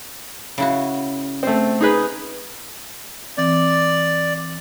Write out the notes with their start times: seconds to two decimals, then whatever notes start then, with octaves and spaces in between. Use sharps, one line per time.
0.58 C#3 E4 F#4
1.43 A3 C4
1.81 D#4 G#4 B4
3.38 E3 C4 D5